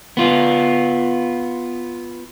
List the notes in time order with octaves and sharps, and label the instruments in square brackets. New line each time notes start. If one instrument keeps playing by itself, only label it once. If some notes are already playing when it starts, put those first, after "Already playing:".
[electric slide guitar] B3 F4